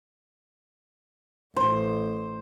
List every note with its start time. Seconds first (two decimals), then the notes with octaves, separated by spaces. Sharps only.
1.56 A1 C5